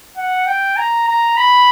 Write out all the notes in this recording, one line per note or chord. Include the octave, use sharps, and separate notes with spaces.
F#5
G5
A#5
A#5
B5